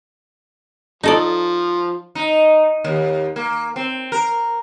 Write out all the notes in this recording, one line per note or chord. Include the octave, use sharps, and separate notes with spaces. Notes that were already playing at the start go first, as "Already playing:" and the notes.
F3 D#4 A4 D5
D#4
D#2
A#3
C4
A#4